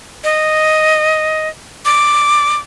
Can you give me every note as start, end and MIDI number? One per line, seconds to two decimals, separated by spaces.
0.24 1.48 75
1.85 2.58 86